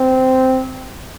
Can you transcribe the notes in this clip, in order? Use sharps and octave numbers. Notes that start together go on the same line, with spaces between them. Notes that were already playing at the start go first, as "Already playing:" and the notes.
Already playing: C4